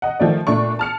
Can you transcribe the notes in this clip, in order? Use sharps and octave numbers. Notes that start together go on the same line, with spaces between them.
D#5 F#5
D#3 F3 A3 D5
A#2 A3 D4 C#6
A5 F6 C#7